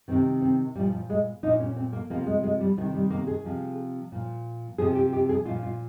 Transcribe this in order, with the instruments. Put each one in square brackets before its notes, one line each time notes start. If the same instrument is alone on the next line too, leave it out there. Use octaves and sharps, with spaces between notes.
[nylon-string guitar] C3 D#3 C4
C4
A#2 G3
F3
F3
G#3
A#2 F3 D#4
C#4
C4
A#3
C3 F3 A#3
G#3
G#3
G3
C3 F3
D#3
G3
A#3
G#4
C3 F3
A#2 F3
C3 F3 G#4
G4
G4
G#4
A#2 F3 F4
F4